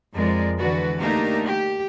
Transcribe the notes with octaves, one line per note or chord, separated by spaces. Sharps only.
F2 F3 G#3 A#4 D5
D3 E3 G#3 F#4 B4 D5
A3 A#3 D4 D#4 G4 A#4
G4